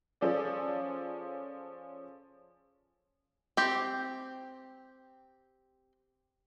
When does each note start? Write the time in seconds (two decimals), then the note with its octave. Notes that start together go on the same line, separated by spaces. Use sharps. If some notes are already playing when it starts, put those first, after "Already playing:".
0.21 F3 C#4 G#4 A4 D5
3.57 C4 G4